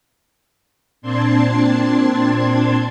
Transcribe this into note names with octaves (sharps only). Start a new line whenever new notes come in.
A#2 C4 D4 A5 C6 G#6